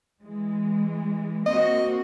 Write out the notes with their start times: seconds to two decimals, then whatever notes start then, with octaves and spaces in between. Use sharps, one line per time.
0.23 E3 G#3
1.46 A#3 C4 F#4 D#5